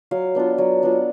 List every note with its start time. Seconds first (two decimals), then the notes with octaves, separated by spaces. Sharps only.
0.11 F#3 F5
0.35 B3 D4 F4
0.58 F#3
0.83 B3 D4 F4